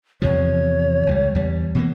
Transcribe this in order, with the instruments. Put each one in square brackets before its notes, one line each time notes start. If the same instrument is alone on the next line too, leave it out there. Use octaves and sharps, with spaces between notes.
[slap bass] E2 C3 F3 [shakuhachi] C#5
[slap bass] C#2 F3 G3
E2 G3
B2 E3 A#3